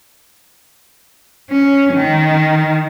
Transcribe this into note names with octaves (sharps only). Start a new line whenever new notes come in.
C#4
D#3